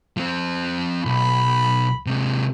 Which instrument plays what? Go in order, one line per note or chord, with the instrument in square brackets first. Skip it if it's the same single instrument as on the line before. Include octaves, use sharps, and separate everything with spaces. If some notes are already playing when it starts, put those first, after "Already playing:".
[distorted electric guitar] F3 C4
[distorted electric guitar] B1 [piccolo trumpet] B5
[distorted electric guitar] C3 G#3